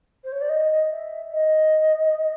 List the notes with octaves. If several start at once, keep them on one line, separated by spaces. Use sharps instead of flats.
C5
C#5
D5
D#5
E5
D#5